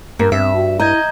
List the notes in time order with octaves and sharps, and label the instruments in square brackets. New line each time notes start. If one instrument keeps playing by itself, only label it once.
[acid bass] G2 [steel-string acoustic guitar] A#3
[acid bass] G2 [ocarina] C4 [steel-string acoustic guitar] E5
[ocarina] F#4
[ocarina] E4 [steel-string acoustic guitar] D#5 [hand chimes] A#5 G6 G#6